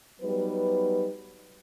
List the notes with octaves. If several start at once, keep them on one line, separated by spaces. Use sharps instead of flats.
F#3 G3 B3 D#4 B4